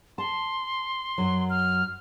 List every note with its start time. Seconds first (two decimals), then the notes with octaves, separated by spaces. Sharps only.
0.18 A5 C6
1.18 F#2 F#3
1.50 F6